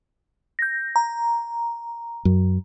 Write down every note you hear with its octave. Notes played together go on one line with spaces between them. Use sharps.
G6 A#6
A#5
F#2